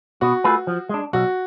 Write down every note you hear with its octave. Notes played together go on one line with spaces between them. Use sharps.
B2 F#4
A3 F4 G#4 B4
F3
G#3 D4
B1 F#4